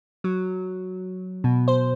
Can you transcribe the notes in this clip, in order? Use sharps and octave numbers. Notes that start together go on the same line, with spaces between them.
F#3
B2
C5